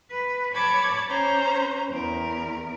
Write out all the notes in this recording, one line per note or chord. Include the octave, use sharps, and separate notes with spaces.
B4
C#5 A5 B5 D6 G#6
C#4 C5 C#5 A#5
E2 A#4